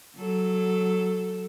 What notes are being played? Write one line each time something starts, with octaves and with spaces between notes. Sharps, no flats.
F#3 A4